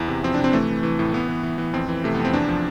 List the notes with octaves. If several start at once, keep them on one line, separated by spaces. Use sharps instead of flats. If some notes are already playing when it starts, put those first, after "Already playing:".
Already playing: E2 E4
C3
F3 C4
D4
C3
C4
E3 A3
E3
E3
A2
E3 B3
E3
E3
E3
F2 C4
E3
C3 A3
B3
F2
C4
E2 D4
F3